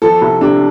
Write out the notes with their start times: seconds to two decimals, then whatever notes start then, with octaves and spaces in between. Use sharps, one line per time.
0.02 F3 A4
0.21 C2
0.41 C3 D4